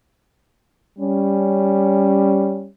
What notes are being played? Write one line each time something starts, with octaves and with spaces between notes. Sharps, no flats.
G3 C#4